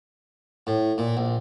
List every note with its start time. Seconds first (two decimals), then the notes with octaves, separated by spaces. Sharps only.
0.67 A2
0.98 A#2
1.17 A#1